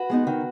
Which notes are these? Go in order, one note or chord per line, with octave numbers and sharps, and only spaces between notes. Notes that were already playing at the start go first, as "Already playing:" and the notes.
Already playing: F#4 B4
G#3 B3 D#4
D#3